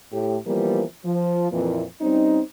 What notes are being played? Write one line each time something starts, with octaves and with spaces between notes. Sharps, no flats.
A2 G4
E3 F3 G3 A#3 B3 A#4
F3
F2 A#2 E3
G3 C4 C#4 D#4